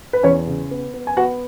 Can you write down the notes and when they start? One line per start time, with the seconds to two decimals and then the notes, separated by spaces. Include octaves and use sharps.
0.13 B4
0.23 E2 C#4 C#5
0.47 C#3
0.71 B3
0.94 B3
1.07 G#5
1.17 B3 F#4 F#5